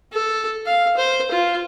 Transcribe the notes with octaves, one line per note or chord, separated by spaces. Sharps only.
A4
F5
C5
F4